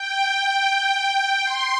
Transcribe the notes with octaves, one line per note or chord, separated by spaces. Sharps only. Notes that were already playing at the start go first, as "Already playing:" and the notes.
Already playing: G5
G5
C6